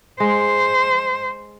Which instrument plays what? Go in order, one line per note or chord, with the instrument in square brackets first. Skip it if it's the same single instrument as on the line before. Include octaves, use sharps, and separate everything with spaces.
[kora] G#3 [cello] C5